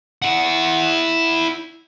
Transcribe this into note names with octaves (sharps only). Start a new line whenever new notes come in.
E4 F#5